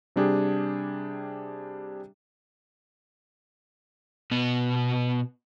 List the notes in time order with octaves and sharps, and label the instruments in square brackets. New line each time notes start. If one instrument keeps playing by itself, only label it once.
[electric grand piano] C3 G3 D4 G4 G#4
[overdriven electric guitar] B2 B3